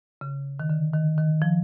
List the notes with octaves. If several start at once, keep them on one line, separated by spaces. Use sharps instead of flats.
C#3
D#3
D3
D#3
D#3
F3